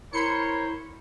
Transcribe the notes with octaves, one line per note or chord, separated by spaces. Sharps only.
E4 A#4 C5 C#5 B5 C6 C#7